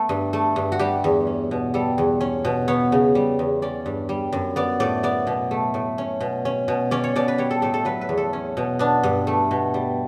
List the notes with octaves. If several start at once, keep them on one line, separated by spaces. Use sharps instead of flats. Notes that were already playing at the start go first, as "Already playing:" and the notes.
Already playing: A3 B3 A4
G2
A3
G2
F#4
G3 G4
E2
C#4
B2
G3 A4
E2
C#4
B2
B3 C#5
C#3
G3
E2
C#4 D5
G2
G3
F#2
B3 D5
A2 D5
B3 D5
B2
A3
A2
C#4
B2
C#4
B2
C#4 D5
C#5
B2 D5
B4
G3 C#5
A4
A2 A4
A4
F#3 B4
B4
E2
A4
C#4
B2
B3 D4
G2
A3
B2
G3